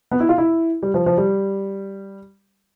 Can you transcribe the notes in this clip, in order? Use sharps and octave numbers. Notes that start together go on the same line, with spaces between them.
B3
E4
F4
E4
G3
F3
F3
G3